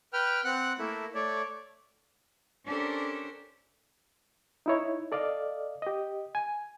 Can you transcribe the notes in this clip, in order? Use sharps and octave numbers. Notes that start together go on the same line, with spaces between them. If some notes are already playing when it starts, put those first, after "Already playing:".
B4 G5 F6
C4 F#5 F#6
A3 A#3 E4
A3 C#5 D5
C#4 D4 G4 A4 A#4 C5
D#4 E4 C#5
A4 D5 D#5 F5
G4 D#5
G#5